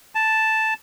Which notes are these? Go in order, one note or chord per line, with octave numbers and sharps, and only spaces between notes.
A5